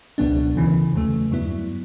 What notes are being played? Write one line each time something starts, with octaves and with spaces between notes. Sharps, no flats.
C#2 B2 F#3 B3 D4
D2 C#3 E3
E2 C#3 F#3 A3
G2 F#3 B3 E4